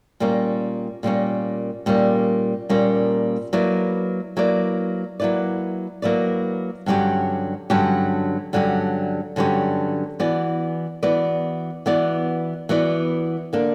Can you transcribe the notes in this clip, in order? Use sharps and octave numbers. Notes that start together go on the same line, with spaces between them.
A#2 G3 A#3 C#4
A#2 G3 A#3 C#4
A#2 G3 A#3 C#4
A#2 G3 A#3 C#4
F#3 A#3 E4 B4 D5
F#3 A#3 E4 B4 D5
F#3 A#3 E4 B4 D5
F#3 A#3 E4 B4 D5
G2 D3 F#3 C#4 G4
G2 D3 F#3 C#4 G4
G2 D3 F#3 C#4 G4
G2 D3 F#3 C#4 G4
E3 B3 F#4 B4 D5
E3 B3 F#4 B4 D5
E3 B3 F#4 B4 D5
E3 B3 F#4 B4 D5
D3 A#3 D4